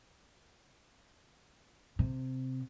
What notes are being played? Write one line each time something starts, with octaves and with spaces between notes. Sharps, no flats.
C3